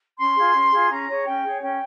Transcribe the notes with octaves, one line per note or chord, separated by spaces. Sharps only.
C#4 C6
F4 G#4
C#4
F4 G#4
C#4 A#5
G#4 C#5
C#4 G5
G#4 C#5
C#4 G5